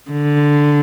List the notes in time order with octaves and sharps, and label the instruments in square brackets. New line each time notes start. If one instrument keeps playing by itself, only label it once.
[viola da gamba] D3